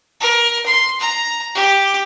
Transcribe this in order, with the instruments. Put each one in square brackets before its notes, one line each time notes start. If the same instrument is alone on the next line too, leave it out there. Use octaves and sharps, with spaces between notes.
[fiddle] A#4
C6
A#5
G4